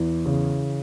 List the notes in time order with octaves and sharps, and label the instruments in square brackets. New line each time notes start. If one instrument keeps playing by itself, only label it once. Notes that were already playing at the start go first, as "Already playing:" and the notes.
Already playing: [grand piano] E2 E3
C#3